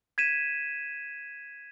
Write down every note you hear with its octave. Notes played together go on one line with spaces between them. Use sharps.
G#6 B6 D#7 E7